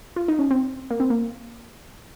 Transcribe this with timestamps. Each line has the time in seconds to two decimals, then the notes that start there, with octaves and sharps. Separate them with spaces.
0.16 F4
0.28 D#4
0.39 C#4
0.51 C4
0.90 A#3
1.00 C4
1.10 A#3